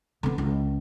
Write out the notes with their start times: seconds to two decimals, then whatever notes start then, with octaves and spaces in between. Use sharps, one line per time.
0.23 D3 B3
0.38 C#2